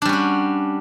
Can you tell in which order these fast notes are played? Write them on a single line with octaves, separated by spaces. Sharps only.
D4 G3 C#4 F#4